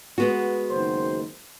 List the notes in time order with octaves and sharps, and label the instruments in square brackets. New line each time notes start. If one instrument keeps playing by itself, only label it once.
[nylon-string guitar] G#3 B3 F#4
[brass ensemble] F#1 D#3 C5